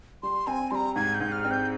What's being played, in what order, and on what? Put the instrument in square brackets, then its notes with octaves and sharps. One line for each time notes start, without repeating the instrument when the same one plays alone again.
[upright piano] G3 [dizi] C6
[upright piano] C4 [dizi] G#5
[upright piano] G3 [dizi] A#5 C6
[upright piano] G#2 [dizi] G#6
[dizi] G6
[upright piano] G#2
[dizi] F6
[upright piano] C4
[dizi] G6